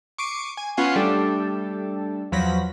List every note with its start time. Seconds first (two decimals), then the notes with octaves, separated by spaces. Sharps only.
0.18 C#6 D6 C7 D7 D#7
0.57 G#5
0.77 B3 C#4 F4 F5 F#5 G#5
0.96 G3 A3 D4 G4 A4
2.32 E2 F3 F#3 B5 A#6